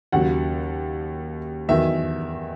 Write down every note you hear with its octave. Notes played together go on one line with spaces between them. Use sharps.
D#2 C#3 F#3 F#5
E2 D#3 F#3 E5